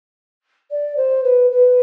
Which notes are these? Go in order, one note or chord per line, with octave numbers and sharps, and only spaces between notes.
D5
C5
B4
B4